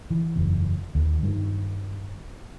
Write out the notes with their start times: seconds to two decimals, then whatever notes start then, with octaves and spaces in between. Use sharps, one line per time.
0.10 E3
0.36 F#1 E2
0.95 D#2
1.23 G2 D#3